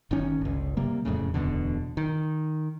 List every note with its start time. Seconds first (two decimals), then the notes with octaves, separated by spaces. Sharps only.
0.11 G1 D#3 C#4
0.41 G1 C#2
0.77 C3 G3 A#3
1.05 E1 F2 A2 C#3
1.34 D1 E2 B2 D3
1.97 D#3